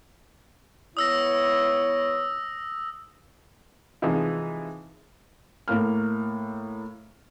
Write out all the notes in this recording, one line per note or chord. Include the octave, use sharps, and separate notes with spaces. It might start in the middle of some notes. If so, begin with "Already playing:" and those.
B3 E4 C#5 D#6 E6 A#6
C3 E3 F3 G#3 D#4 E4
A2 A#3 F6